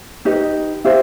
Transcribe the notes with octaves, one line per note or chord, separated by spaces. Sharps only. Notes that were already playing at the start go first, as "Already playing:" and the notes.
D#4 G4 B4 D#5
E4 G4 C5 F5